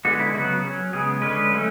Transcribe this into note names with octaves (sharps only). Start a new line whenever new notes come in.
D3 G#3 B3 F#4
E4
C#3 F#3 B3 F#4
F#3 C#4
C#3 G#3 B3 G#4
D3 G#3 C#4 B4
F#3 A3 C#4